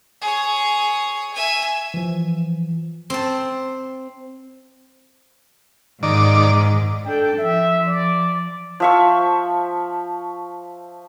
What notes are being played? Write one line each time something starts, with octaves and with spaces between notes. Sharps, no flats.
G#4 C#5
E5 G#5
E3 F3
C4 A5
G#2 D#3 D5
D4 A4 G5
F3 E5
D5
F3 E5 C#6